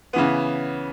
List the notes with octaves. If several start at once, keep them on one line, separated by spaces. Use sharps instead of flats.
C#3 E3 B3